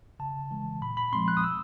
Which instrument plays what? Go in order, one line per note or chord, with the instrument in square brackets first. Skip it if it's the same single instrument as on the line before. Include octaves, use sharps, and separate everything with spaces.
[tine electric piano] C#3 A5
E3 G#3
A#2 B5
B5
F3 G#3 C4 C6
F#6
D#6
B2 E6